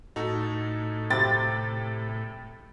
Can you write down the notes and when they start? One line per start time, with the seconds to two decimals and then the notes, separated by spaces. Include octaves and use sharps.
0.16 A2 D#4 F#4 A4
1.10 C3 G5 B5 A6